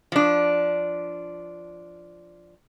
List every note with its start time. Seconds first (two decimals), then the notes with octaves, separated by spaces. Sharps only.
0.12 F3 D4